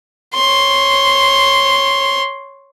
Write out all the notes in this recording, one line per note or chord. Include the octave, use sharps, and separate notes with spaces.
C#5 C6